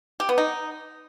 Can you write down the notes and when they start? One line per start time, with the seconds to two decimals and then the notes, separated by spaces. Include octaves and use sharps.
0.20 G4
0.29 B3
0.38 D#4